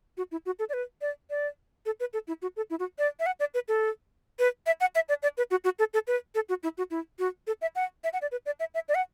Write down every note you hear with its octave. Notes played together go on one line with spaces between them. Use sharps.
F#4
E4
F#4
A4
D5
B4
D5
D5
A4
B4
A4
E4
F#4
A4
E4
F#4
D5
E5
F#5
D5
B4
A4
B4
E5
F#5
E5
D5
D5
B4
F#4
F#4
A4
A4
B4
A4
F#4
E4
F#4
E4
F#4
A4
E5
F#5
E5
F#5
D5
B4
D5
E5
E5
D5
F#5